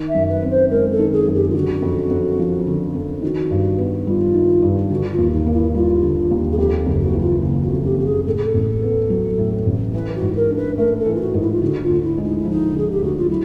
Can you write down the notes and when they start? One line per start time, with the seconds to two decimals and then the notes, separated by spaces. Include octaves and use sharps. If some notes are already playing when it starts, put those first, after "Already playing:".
Already playing: D#3
0.08 E5
0.14 F#2
0.29 B4
0.42 C4
0.50 C5
0.70 G#3 A#4
0.92 A4
0.99 D#3
1.13 G#4
1.27 F#2
1.34 G4
1.49 F4
1.54 D3 F#4
1.82 F2
2.11 F2
2.39 F3
2.67 D3
2.95 F2
3.22 D#3 F#4
3.50 G2
3.78 B3
4.07 G3 F4
4.34 D#3
4.62 G2
4.90 D3 F#4
5.11 F4
5.18 D#2
5.32 D#4
5.46 A#3
5.53 E4
5.75 G3 F4
6.03 D3
6.31 D#2
6.52 G#4
6.58 F2 G4
6.86 F#1
7.00 F#4
7.14 E3
7.21 F4
7.42 C#3
7.63 F#4
7.70 F2
7.84 G4
7.98 F#1 G4
8.05 G#4
8.26 A2 A4
8.35 G#4
8.45 A4
8.54 A1
8.82 B3
9.10 F#3
9.38 A2
9.66 A1
9.94 E3 B4
10.15 F#4
10.21 G#2
10.36 A#4
10.50 D4
10.56 B4
10.77 A3 A#4
10.99 A4
11.06 E3
11.15 F4
11.20 F#4
11.34 G#2
11.40 E4
11.51 F4
11.62 D3 F#4
11.83 F4
11.89 D2
12.03 E4
12.18 G#3
12.25 D#4
12.37 E4
12.45 F3
12.50 D#4
12.73 D3 G#4
12.90 G4
13.02 D2 F#4
13.17 F4
13.29 F#3 E4